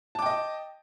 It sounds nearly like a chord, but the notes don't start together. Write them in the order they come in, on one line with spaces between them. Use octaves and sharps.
A5 D6 G5 D#5